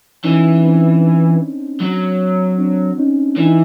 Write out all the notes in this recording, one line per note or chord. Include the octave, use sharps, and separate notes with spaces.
E3 C#4 D#4
C4 D4
F#3
C4 D4
C#4 D#4
E3 D4
D#4